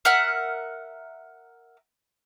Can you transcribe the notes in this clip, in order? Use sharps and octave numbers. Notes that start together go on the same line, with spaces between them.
A#4 E5 F#5 F6